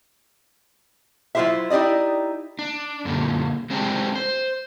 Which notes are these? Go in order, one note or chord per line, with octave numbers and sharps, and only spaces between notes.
F#3 E4 F4 G4 C5 E5
D#4 E4 G4 D5 D#5
D4
F#2 A#2 D3 G3
F#3 G#3 C4 D4 G4 G#4
C5